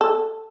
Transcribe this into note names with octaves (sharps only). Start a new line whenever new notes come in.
A4